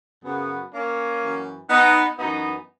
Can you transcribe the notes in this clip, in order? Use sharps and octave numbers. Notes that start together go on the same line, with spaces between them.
F#2 C#3 F#3 B3
A#3 C#4
F#2 E3
B3 D#4
F#2 E3 B3 D#4